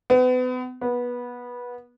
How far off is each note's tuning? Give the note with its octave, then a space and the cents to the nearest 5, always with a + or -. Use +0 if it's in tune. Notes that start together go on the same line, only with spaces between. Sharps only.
B3 +35
B3 -20